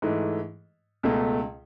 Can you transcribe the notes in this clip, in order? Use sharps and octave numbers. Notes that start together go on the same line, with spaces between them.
G#2 E3 A3
C#2 B2 A3